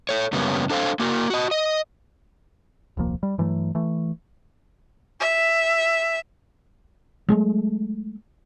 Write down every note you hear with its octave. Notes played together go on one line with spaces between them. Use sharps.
A4 C#5
F#2 C#3 G3 A#3 B3 C#4
D4 A4 C5 F5
A#3 F#4 A#4
F#4 D#5
D#5
D#1 C2 F3 A#3
G3
G2 E3 F#3 A3
E3 A3
E5
F#3 G#3 A3